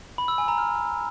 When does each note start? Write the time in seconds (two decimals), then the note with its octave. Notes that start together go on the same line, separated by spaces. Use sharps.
0.18 B5
0.28 E6
0.38 G#5
0.48 A#5
0.58 F6